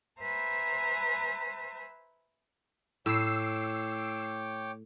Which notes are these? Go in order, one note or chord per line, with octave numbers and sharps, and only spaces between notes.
B4 C5 E5 G#5 A#5
A2 C#5 G5 D6 E6 C7